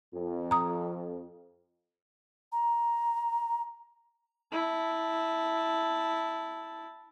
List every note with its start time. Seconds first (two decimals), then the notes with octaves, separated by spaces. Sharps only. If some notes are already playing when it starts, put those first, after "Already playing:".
0.14 F2
0.51 A#5 D#6
2.52 A#5
4.52 E4 A5